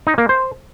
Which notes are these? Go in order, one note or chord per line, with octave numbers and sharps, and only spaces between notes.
D#4
A#3
C5